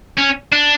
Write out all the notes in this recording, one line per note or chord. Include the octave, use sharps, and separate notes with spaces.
C#4
D4